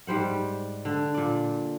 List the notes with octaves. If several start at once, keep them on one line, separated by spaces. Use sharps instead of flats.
G#2 G3 C5 F#5
D3
A#2 D5